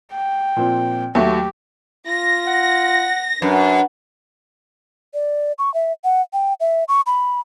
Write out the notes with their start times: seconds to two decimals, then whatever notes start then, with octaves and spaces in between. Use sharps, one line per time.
0.12 G5
0.56 A#2 F3 C4
1.15 D#2 F#3 A3 G4
2.07 F4 A#6
2.47 F#5
3.42 F#2 D4 B4
5.14 D5
5.59 C#6
5.74 E5
6.04 F#5
6.33 G5
6.60 E5
6.88 C#6
7.06 B5